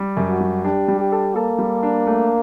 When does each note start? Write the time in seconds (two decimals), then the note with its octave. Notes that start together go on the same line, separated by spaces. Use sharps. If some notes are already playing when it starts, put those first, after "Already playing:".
Already playing: G3
0.17 F#2
0.29 F#4
0.40 G3
0.64 D4 G4
0.88 G3
1.00 G4
1.12 A4
1.35 A#3 A4
1.58 G3
1.83 D4
2.07 A3